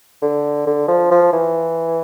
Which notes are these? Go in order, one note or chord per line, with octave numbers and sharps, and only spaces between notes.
D3
D3
F3
F3
E3